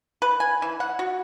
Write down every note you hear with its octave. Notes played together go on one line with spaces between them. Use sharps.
B4
G#5
E3
F#5
F#4